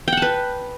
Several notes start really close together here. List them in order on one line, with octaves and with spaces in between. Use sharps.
G5 F#5 A5 B4